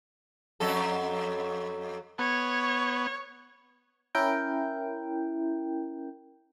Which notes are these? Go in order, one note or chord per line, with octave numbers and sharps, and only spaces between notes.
F2 F#3 A4
B3 C#5
C#4 E4 A#4 G5